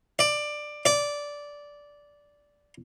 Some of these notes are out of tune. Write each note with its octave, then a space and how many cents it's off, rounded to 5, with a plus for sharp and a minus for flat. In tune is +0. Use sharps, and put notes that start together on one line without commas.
D5 +15
D5 -10